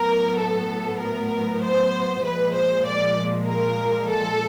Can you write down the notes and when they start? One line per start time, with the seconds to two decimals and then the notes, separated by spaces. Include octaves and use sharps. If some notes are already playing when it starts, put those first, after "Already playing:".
Already playing: A2 F#3 B3 A#4
0.37 A4
0.99 A#4
1.62 C5
2.23 A#2 F3 G#3 B4
2.54 C5
2.85 D5
3.47 A#4
4.09 A4